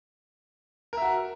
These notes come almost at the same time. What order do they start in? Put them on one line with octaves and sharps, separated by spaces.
A#4 E5 F#4